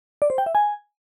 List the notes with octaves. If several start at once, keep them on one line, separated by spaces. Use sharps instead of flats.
D5
C5
G5
E5
G#5